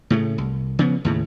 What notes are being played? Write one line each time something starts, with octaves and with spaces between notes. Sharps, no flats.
A2 C#3 A3
C2
C#3 F3 B3
D#2 A2 C#3